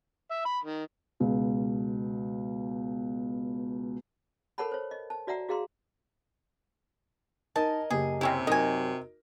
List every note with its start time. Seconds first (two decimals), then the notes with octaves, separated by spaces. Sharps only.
0.31 E5
0.45 B5
0.63 D#3
1.20 C#2 B2
4.58 A4 A#4 C#5 F#5 A5 B5
4.72 C5 C#5
4.91 D#5
5.10 A5
5.27 F#4 D5 E5 F#5 A#5
5.49 F#4 G#4 F5 A#5 C6
7.56 D#4 A#4 D#5 G#5 A5
7.90 F#1 G4 G#4
8.21 C3 C4 C#4 E4
8.47 F#2 F#3 D#4 A#4 D#5 G#5